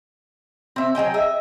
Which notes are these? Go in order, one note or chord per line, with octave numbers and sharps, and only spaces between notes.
C4 E5
F#3 G#4 D#5 G5
D#5 E5